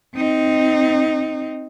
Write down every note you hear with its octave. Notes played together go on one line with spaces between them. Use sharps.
C4 D#4